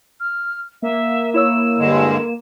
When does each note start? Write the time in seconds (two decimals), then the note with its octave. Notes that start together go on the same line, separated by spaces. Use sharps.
0.20 F6
0.82 A#3 E5
1.34 E4 C#5 E6 E7
1.78 G2 D3 G#3